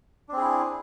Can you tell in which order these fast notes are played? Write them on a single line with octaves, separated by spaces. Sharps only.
D4 C4 G#4 E4